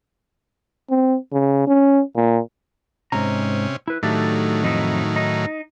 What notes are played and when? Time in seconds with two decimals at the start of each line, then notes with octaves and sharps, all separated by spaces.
0.90 C4
1.32 C#3
1.67 C#4
2.16 A#2
3.12 G#2 C3 C#4 A#5
3.88 E4 B4
4.03 A2 D#3 F#3 A3 D4 G4
4.63 F2 D#4 E4
5.16 D#4